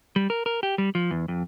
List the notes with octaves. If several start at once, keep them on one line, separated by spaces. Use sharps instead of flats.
G3
A#4
A#4
G4
G3
F3
E2
F2